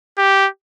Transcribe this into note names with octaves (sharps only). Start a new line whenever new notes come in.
G4